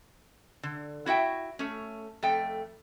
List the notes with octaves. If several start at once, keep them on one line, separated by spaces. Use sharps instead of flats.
D3
E4 F#4 E5 G5
A3 C#4
F2 A3 G5